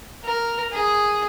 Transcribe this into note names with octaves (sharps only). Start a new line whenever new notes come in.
A#4
G#4